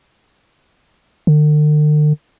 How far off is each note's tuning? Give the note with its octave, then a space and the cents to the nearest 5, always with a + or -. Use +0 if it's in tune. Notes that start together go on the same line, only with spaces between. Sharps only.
D3 +45